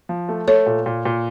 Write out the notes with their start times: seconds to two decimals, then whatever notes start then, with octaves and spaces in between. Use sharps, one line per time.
0.09 F3
0.29 A3
0.48 A3 A4 C#5
0.66 A#2
0.86 A#2
1.05 A#2